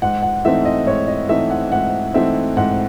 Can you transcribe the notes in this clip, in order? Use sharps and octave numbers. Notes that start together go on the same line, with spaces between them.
G#2 F#5
F#5
E3 A3 C4 D#4 E5
D#5
G#2 C#5
D#5
E3 A3 C4 D#4 E5
F#5
G#2 F#5
E3 A3 C4 D#4 E5
G#2 F#5